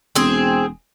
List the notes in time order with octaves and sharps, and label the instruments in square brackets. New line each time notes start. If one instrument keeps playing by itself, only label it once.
[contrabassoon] E1 [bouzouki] C4 G#4